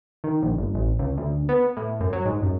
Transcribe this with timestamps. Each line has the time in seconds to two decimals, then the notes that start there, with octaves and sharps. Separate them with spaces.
0.24 D#3
0.42 A#1
0.58 G1
0.74 A1
0.99 C#2
1.18 D2
1.49 B3
1.77 A2
2.00 F#2
2.13 F#3
2.25 G#2
2.42 F#2